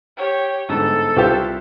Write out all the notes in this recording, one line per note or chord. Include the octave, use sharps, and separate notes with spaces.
G4 C#5
G1 G#2 A4
C2 C4 F4 G4 C#6